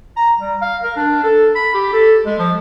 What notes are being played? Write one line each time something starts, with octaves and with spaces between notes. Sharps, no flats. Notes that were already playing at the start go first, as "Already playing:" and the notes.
A#5
G3
F5
A#4
D4
A4
B5
G4
A4
G#3
F3